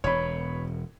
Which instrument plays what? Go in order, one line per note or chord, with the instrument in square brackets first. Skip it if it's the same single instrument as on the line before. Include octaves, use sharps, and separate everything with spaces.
[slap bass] E1 B2 [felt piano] C#5 B5